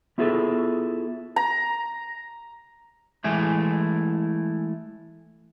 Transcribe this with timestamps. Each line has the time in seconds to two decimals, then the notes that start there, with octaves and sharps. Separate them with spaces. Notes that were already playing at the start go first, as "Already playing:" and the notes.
0.18 B3 E4 F4 G#4 A4
1.36 A#5
3.24 E3 G#3 A3 E4